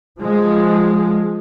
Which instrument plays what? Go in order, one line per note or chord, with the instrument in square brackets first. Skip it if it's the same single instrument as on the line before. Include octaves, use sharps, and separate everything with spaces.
[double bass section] F3 G#3